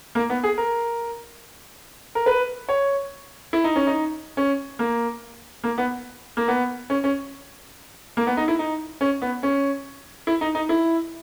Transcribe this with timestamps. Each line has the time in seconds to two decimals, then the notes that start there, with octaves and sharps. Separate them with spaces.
0.15 A#3
0.30 B3
0.44 G#4
0.58 A#4
2.15 A#4
2.26 B4
2.69 C#5
3.53 E4
3.64 D#4
3.76 C#4
3.87 D#4
4.37 C#4
4.79 A#3
5.64 A#3
5.78 B3
6.37 A#3
6.48 B3
6.90 C#4
7.04 C#4
8.17 A#3
8.27 B3
8.37 D#4
8.48 E4
8.59 D#4
9.01 C#4
9.22 B3
9.43 C#4
10.27 E4
10.41 D#4
10.55 D#4
10.69 E4